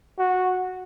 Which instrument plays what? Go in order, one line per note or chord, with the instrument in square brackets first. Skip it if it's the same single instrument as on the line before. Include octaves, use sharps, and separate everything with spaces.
[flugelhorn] F#4